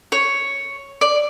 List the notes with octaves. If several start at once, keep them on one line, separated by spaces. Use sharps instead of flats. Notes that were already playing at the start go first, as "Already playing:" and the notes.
C#5
D5